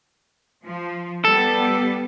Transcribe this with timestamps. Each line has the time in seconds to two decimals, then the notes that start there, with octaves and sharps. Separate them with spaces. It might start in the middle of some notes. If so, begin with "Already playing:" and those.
0.65 F3
1.25 G3 B3 A4